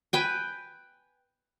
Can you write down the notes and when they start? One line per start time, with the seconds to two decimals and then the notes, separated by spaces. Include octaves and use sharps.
0.13 B4 G5 G#5